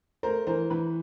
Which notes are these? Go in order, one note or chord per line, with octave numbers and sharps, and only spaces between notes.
A3 A#4 C5
E3 A#4 C5
E3 B4